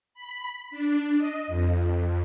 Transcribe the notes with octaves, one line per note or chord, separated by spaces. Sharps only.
B5
D4
D#5
F2